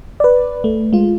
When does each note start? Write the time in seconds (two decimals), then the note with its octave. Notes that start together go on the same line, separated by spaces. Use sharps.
0.20 B4 D5
0.64 A3
0.93 G#3 F4